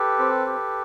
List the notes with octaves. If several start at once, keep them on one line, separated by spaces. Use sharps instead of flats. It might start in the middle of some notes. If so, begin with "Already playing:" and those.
Already playing: G4 A4 B4
C4
G4